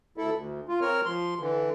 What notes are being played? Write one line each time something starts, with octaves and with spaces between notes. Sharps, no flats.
D2 E4 A4
D2
F4
C4 A#4 C#5 F6
F3 C6
D3 E3